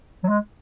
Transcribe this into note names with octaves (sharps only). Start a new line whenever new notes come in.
F#3
G#3